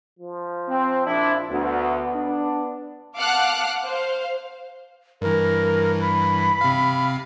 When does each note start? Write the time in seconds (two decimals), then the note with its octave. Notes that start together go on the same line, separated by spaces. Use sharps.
0.19 F3
0.69 C4
1.06 A#1 D4 E4
1.49 D2 B3
2.15 D4
3.15 F5 F#5 A5 D6 F6 F#6
3.83 C5 F5
5.22 G2 E3 A#4
6.01 B5
6.61 C3 F5